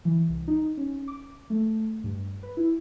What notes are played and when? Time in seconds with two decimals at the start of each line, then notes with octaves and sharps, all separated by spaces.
0.05 E3
0.28 C2
0.48 D#4
0.77 C#4
1.08 D6
1.50 A3
2.04 G2
2.43 B4
2.57 E4